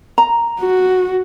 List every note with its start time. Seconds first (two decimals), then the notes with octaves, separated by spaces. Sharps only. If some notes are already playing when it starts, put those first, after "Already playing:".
0.18 A#5
0.60 F#4